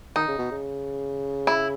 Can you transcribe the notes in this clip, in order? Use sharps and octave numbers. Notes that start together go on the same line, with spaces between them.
D#3 D#4
C#3
B2
C#3
E4